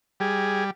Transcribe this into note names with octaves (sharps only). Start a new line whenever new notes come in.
G3 G#4